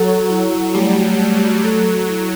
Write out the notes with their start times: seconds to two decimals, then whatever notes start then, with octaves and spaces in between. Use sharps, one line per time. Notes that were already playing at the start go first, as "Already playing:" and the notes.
Already playing: F#3 A4
0.29 F#3 E4
0.74 G3 A3
1.19 F#3 A3
1.64 F#3 A4
2.09 E4